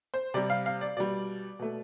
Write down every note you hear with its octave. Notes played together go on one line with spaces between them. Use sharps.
C5
C3 G3 D5
F5
F5
D5
B2 G3 D5
B2 A3